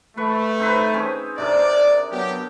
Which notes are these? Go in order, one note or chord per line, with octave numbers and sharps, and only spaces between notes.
A3 B4 C#6
C4 D#4 B4
C4 C#4 G#4
C3 D4 A#4 D5
F#3 B3 G4